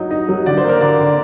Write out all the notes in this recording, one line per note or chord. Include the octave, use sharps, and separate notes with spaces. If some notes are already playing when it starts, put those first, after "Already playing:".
Already playing: F#3 D#4
D#4
F#3
D3 D5
C5
A#3
A#4
D3 D5
D3